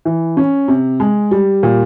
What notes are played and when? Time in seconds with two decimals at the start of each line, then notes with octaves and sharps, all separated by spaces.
0.05 E3
0.37 C#4
0.68 C3
1.00 G#3
1.31 G3
1.63 A#2